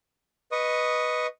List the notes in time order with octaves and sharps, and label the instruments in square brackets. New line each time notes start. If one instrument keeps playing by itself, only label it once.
[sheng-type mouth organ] B4 D#5 C#6 D#6